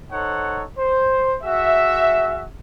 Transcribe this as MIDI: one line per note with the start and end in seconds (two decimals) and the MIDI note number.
0.11 0.62 63
0.11 0.62 69
0.11 0.62 72
0.11 0.62 73
0.11 0.62 78
0.78 1.36 72
1.43 2.44 66
1.43 2.44 68
1.43 2.44 76